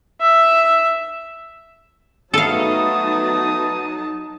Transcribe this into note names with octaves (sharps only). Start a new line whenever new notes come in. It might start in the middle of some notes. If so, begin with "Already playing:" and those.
E5
F#3 A3 B3 D#4 A4 F5 A5 D#6